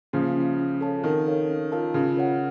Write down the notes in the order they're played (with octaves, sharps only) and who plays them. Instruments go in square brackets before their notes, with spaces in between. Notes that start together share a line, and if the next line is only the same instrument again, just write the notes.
[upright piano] C#3 F3 [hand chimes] A#3
[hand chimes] C#4 F4
C#4
A4 C#5 A5
[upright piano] D#3 [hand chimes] C4
[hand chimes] D#4 A4 C#5 F5
C#4
F4 A#4 F5 A5
[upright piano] C#3 [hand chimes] F4
[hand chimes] A#4 C#5 F#5